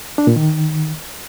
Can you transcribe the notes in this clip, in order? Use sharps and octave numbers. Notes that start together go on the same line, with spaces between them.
D4
A#2
D#3